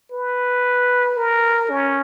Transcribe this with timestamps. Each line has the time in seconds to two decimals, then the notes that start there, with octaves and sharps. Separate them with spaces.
0.12 B4
1.17 A#4
1.70 C#4